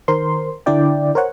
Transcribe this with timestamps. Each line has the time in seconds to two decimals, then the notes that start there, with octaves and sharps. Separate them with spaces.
0.08 D#3 A#4 C5 C6
0.66 D3 D4 E4 D5 G5
1.15 A#4 C5 C#5 F#5